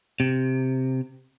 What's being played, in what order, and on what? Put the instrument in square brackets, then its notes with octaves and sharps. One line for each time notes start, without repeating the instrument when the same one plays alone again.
[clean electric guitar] C3